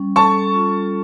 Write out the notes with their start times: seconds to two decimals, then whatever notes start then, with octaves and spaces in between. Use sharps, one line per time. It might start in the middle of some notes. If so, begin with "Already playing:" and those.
Already playing: G3 C#4
0.16 A4 A5 C#6
0.54 F4